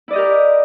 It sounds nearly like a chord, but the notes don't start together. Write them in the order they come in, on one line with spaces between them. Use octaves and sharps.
E4 D5 D#5 G4 A#4